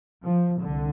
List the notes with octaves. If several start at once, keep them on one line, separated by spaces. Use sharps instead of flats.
F3
C2 D3